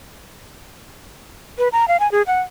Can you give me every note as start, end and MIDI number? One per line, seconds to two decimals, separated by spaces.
1.58 1.68 71
1.72 1.88 82
1.88 1.99 77
2.00 2.10 80
2.12 2.22 68
2.27 2.40 78